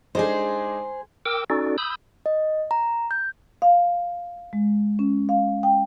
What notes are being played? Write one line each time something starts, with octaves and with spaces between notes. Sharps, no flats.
G#3 D4 D#4 G#4 C5
A#4 G5 D6 E6
C#4 D#4 F#4 A4 D5
B5 D#6 E6 G6
D#5
A#5
G6
F5
G#3
C#4
F5
G5